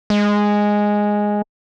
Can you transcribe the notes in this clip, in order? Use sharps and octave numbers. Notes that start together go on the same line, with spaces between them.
G#3